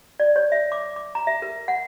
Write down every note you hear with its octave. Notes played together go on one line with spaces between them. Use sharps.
D5
C#5
E5
D6
D6
A#5
E5
A#4
F#5